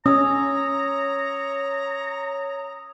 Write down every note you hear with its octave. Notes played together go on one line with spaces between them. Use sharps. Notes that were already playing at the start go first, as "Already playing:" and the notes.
C#4 C#5 A#5 D#6 E6